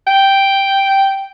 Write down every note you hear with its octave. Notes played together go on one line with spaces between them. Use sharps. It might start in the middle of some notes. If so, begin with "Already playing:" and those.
G5